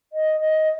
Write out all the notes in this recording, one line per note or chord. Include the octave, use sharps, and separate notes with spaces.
D#5
D#5